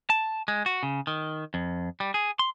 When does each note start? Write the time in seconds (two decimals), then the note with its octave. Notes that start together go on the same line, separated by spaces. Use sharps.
0.10 A5
0.48 G#3
0.66 F#4
0.83 C#3
1.07 D#3
1.54 F2
2.00 G3
2.14 G#4
2.39 C6